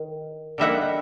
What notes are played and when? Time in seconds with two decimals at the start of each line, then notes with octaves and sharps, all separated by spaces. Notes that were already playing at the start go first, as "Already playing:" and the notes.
Already playing: D#3
0.58 D3 G3 A#3 D#4 E5 F#5